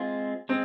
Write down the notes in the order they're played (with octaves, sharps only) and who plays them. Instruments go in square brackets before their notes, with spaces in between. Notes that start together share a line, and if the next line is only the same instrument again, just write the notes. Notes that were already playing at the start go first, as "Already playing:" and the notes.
Already playing: [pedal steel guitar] G#3 C4 F4
[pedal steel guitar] G#3 [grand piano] C4